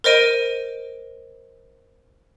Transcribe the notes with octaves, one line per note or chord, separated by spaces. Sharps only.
A#4 C5 D#5 D7 D#7